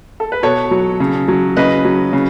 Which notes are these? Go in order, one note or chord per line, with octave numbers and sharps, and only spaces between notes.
A4
B4
B2 A4 C#5
F#3
C#3
F#3
C#3 B4 D#5
F#3
C#3